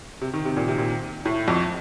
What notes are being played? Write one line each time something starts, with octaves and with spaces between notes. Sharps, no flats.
C3
D#3
C3
A#2
C3
A#2
A2
F2